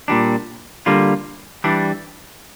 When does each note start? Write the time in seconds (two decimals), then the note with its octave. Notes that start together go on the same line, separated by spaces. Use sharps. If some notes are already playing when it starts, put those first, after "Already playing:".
0.08 A#2 G3 D4
0.86 D3 G3 A#3 F4
1.64 E3 G3 D4